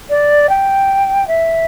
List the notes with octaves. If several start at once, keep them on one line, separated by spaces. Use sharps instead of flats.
D5
G5
E5